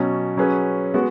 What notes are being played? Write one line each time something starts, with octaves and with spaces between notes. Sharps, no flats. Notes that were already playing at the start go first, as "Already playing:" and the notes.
Already playing: B2 F#3 C#4
F#3 C#4 G#4 B4
G#3 B3 F#4